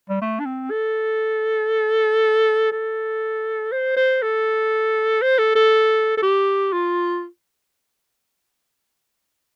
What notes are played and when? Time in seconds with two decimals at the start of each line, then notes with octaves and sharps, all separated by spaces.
0.10 G3
0.21 A3
0.40 D4
0.45 C4
0.71 A4
2.72 A4
3.72 C5
3.96 C5
4.22 A4
5.22 C5
5.38 A4
5.55 A4
6.17 A4
6.22 G4
6.73 F4